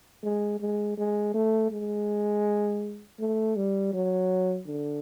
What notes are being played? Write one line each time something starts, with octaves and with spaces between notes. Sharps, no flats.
G#3
G#3
G#3
A3
G#3
A3
G3
F#3
D3